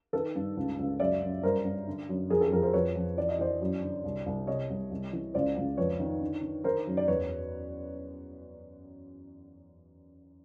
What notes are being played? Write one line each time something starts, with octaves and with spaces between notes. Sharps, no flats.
D#3 A4 B4
G2
C#2
C#2
F#2 D5 E5
F#2
G2 A#4 C5
G2
D3
F#2
F2 G#4 A#4
G4 A4
F2 G#4 A#4
A#4 C5
F2 B4 C#5
F2
E3 D5
D#5
E3 C5 D5
F#2
D3
C2
C2
C3 C#5 D#5
C2
C2
E3
C#2 C5 D5
C#2
F2 B4 C#5
D#3
D3
D3
D#3 A#4 C5
F#2
D5
E2 B4 C#5